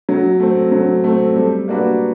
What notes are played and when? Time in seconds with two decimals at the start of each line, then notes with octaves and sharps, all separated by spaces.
0.09 F#3
0.40 A3 C4
0.72 F#3
1.04 A3 C4
1.36 G3
1.68 A#3 D4 F#4 B4